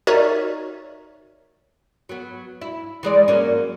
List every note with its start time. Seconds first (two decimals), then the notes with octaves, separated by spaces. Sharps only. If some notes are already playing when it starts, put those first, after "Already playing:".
0.07 D#4 F#4 A#4 C#5 D5 E5
2.09 F#3 B3
2.61 E4
3.03 E3 G#3 D5
3.28 F#3 A#3 C#4